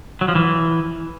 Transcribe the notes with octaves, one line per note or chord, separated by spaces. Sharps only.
F#3
F3
E3